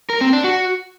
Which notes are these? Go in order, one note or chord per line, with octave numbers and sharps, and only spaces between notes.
A#4
C4
D4
F#4